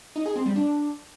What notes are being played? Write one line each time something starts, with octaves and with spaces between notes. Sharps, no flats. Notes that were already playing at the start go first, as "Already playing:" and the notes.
D#4
G#4
C4
G3
D4